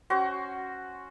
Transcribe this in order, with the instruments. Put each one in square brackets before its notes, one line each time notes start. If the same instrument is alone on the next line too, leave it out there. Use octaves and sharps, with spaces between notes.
[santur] C#4 F#4 C5